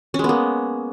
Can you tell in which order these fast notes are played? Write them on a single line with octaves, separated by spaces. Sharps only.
C#4 G#3 B3 A#3